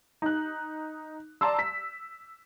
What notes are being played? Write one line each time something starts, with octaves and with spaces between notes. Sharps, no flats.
D#4 F#6
D5 A5 A#5 C6 E6
B6